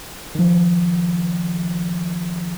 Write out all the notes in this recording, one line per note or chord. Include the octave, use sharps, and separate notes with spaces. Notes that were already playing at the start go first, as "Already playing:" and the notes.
D#3 F3